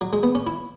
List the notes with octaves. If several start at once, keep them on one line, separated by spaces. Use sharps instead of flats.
F#3
G#3
B3
C#4
E4